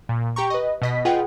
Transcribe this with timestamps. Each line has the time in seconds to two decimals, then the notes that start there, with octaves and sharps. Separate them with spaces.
0.09 A#2
0.36 G4 G5 A#5 C#6
0.50 B4 D#5
0.82 B2 D#5 B6
1.05 F4 G#4 B4 D#5 F#5 G5